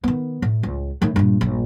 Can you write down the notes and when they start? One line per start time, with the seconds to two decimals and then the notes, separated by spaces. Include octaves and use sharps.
0.04 D#3 B3
0.42 A2
0.63 C#2
1.02 A2 D#3
1.16 G2 A#2
1.41 A#1 G2